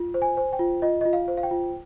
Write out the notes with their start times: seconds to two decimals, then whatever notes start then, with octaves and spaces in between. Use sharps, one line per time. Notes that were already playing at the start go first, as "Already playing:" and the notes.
Already playing: F4
0.14 C5
0.22 G#5
0.37 C5
0.53 G5
0.59 F4
0.82 F4 D#5
1.01 F4 D#5
1.13 F5
1.28 C5
1.37 F5
1.43 G5
1.51 F4